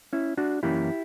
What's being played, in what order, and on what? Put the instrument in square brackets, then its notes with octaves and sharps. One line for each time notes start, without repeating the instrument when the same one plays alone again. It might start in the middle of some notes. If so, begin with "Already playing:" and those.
[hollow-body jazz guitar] C#4 E4
D4 F#4
F#2 E3 A#3 C#4 E4 G4